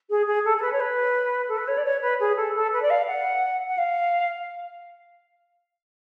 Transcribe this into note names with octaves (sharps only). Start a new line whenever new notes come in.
G#4
G#4
A4
A4
B4
C#5
B4
A4
B4
C#5
D5
C#5
B4
G#4
A4
A4
B4
D5
F5
F#5
F#5
F5